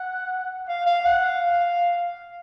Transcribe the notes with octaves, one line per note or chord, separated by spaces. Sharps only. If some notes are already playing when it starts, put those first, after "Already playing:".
Already playing: F#5
F5
F5
F#5
F5